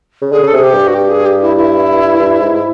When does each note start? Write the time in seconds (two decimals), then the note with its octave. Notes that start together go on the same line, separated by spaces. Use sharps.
0.21 C#3
0.32 D3 G#4
0.43 C#3 A4
0.53 C3 G#4
0.63 G4
0.73 G2
0.88 F#4
0.94 G4
1.10 G#4
1.25 G4
1.41 E4
1.56 E4
2.19 G2
2.40 G#2